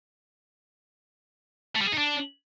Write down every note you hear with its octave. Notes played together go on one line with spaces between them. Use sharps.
A3
G3
G#4
D#4
D4